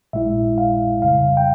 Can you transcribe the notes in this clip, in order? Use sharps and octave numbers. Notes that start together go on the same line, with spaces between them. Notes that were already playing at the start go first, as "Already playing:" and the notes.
A#1 A#2 G#3 E4 E5
F5
F2 C#3 G3 F5
G5